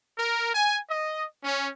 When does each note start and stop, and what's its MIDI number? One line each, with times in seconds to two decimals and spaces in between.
0.17 0.53 70
0.53 0.77 80
0.89 1.23 75
1.42 1.67 61